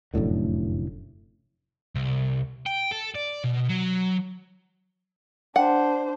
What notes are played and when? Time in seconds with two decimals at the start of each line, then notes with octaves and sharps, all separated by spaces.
0.14 F1 F#2 A2 D3
1.95 C2
2.66 G5
2.92 A4
3.15 D5
3.44 B2
3.69 F#3
5.56 D4 C5 F#5